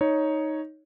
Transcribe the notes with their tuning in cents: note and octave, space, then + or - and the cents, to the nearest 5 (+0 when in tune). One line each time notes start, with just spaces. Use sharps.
D#4 +5 C#5 +0